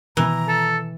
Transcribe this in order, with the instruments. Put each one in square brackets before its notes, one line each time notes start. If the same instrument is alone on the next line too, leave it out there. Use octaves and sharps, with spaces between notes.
[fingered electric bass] B2 D#3 B3 [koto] E3 [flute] A#5
[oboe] A4